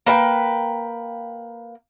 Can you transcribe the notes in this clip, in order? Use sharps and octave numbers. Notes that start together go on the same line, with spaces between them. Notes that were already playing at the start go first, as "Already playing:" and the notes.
A#3 B4 G5